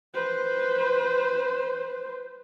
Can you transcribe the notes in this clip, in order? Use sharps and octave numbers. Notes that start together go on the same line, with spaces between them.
B4 C5